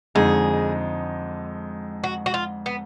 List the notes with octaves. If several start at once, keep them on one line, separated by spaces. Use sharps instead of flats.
F2 D3 G#3 D#4 G#4
F#4
F#4
F4
B3